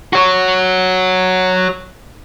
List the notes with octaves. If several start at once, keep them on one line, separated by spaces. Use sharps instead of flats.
F#4 C#5